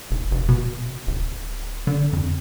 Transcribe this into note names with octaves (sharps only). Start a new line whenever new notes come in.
E1
F1
B2
D1
D3
F2